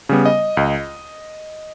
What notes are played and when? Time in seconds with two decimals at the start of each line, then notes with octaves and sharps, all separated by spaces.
0.09 C#3 G3 B3
0.26 D#5
0.57 C#2